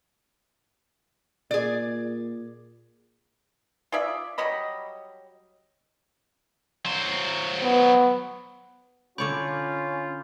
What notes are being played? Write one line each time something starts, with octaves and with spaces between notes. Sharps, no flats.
A#2 G#4 D5
F4 G#4 D5 E5
F#3 G3 D#5 B5
F#3 C5
B3
D3 C#4 F4 C#5 D5 B5 D6 G6